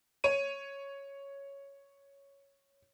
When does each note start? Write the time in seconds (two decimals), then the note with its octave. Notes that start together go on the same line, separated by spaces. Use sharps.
0.24 C#5 D#7